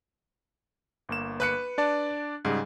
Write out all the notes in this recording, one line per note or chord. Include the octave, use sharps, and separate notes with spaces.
G1 A#3 E7
B4 F#6 C#7
D4 D5 A5
G#2 C#3 G3 G#4